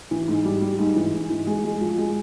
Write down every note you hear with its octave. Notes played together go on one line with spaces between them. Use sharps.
E3
G#2
G3
G3
G#2
E3
G#2
E3
G#3
G#3
F3
G#3